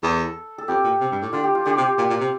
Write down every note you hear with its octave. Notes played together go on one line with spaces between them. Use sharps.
E2 A4
A4
F2 G4
A#2
C3
G2
A2
D3 F4
G4
F4
D3 G4
C3 F4
A#2 G4
A#2
C3